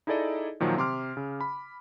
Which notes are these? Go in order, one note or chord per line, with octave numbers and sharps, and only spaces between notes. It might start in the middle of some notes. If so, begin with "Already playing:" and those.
D#4 E4 G#4 A4 D5 D#5
A#2 D#3 F3 F#3
C3 C6 D6 F6
C#3
B5